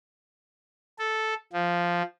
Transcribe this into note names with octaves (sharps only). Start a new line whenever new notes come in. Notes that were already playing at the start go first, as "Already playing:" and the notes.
A4
F3